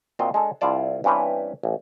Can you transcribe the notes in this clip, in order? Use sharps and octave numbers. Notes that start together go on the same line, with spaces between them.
A#2 C4 F4 F#4 D#5
G#3 D4 A4
C2 E4 F4 D5 A5
G2 E3 C4 C#4 G4 B4
A1